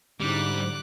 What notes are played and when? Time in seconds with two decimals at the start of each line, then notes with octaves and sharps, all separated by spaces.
0.20 G#2 D3 G3 C#4 E4 D6 F#6